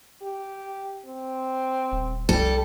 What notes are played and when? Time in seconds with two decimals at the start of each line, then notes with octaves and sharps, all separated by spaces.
0.22 G4
1.06 C4
1.92 D#1
2.29 C2 G3 A4